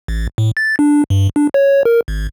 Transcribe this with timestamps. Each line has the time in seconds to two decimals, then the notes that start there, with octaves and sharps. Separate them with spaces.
0.08 A1
0.38 A2
0.57 A6
0.79 D4
1.10 G2
1.36 D4
1.54 C#5
1.85 A#4
2.08 G#1